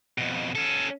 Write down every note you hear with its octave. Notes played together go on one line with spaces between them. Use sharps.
F2 B2
C#4 A4